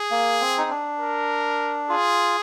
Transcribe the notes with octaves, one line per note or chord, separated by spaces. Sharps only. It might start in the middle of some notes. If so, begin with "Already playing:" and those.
Already playing: G#4
A#3
C4
D#4
D4
A#4
F4 G#4